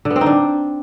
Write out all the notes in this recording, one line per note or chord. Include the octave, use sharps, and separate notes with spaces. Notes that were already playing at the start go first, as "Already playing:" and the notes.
D3
B3
C4
D#4
D4